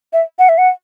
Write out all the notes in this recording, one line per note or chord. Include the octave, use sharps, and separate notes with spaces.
E5
F#5
E5
F#5